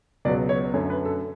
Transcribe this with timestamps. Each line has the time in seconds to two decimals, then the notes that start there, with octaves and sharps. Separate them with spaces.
0.25 C#2 B2 F#3 D5
0.49 C#5
0.74 F#2 D3 A3 C#5
0.90 B4
1.05 A4